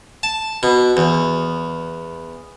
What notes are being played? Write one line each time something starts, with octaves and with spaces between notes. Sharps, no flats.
A5
B2
E2